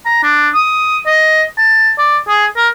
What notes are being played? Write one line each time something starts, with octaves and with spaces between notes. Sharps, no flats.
A#5
D4
D#6
D#5
A5
D5
G#4
A#4